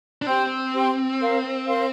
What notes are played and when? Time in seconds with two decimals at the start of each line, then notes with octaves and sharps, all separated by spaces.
0.22 D4
0.26 C4 G4 C5 G5 C6
0.74 G4 C5 G5 C6
1.21 A#4 F5 C6
1.68 A#4 F5 C6